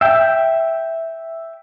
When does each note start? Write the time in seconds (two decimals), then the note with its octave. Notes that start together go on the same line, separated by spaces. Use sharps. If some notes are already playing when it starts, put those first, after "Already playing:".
0.01 E5 G5